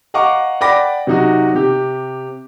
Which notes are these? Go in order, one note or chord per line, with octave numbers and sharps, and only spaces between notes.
D#5 F5 F#5 A#5 C#6 D6
D5 F#5 G5 B5 D6 A#6
C3 F#3 D#4 F#4
C3 G4